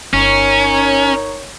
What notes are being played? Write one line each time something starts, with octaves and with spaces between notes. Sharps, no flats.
G1 C#4 D#4 A#4 C#5